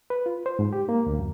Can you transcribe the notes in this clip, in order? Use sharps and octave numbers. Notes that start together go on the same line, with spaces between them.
B4
F4
C5
G#2
G4
A#3
D2
F#2